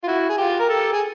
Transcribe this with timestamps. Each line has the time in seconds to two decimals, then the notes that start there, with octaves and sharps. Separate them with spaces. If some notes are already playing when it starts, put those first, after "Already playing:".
0.03 F4
0.07 E4 F#4
0.29 G#4
0.38 F4 G4
0.60 A#4
0.69 G4 A4
0.93 G#4